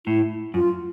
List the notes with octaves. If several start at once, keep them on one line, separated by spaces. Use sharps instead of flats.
A2 E4
F#2 F4